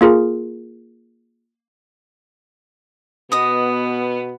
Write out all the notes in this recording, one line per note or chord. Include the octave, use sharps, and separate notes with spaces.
A#3 F4 G#4 A#4
B2 B3 D#5 D#6